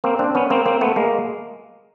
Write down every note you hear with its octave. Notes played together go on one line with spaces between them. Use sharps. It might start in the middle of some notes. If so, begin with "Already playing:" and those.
A#3 C4
C4 D4
B3 C#4
A#3 C4
A#3 C4
A3 B3
G#3 A#3